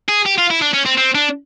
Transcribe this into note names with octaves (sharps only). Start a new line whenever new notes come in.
G#4
G4
F4
E4
D4
C#4
C4
C4
D4